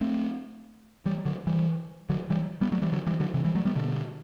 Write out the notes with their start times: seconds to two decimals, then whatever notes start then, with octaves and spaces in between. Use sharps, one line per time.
0.01 A3 C4
1.05 E3 G3
1.26 D3 F#3
1.47 E3 G3
2.09 D3 F#3
2.30 E3 G3
2.61 G3 B3
2.72 F#3 A3
2.82 E3 G3
2.92 D3 F#3
3.07 E3 G3
3.20 D3 F#3
3.34 C3 E3
3.45 E3 G3
3.55 F#3 A3
3.65 G3 B3
3.76 B2 D3